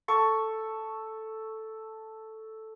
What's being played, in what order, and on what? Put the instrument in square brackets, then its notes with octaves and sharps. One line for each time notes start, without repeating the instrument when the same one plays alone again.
[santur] A4 C#6